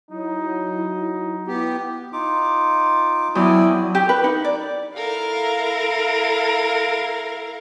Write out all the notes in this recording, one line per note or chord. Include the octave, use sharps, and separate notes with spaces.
F#3 D#4 E4
B3 E4 G4
D#4 F4 D6
E2 F#3 E4 D5 G5 G#5 D#6
G4
B4
D#4
D5
E4 A4 A#4 F5